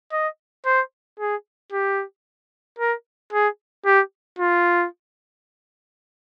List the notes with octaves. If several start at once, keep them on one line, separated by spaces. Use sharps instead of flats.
D#5
C5
G#4
G4
A#4
G#4
G4
F4